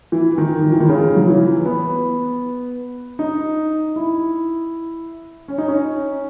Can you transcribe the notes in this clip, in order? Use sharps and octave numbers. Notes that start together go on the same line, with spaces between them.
E3
D#3
D#3
E3
D#3
C#3
F#3
E3
B3
D#4
E4
C#4
D#4
C#4